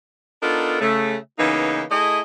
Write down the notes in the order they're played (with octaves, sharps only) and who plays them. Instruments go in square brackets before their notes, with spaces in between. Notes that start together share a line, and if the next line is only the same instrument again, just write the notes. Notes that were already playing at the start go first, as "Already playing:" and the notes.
[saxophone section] B3 D4 D#4 F4 A4 A#4
C#3 A3
C#3 E3 A#3 B3 D#4
A3 E4 G#4 D#5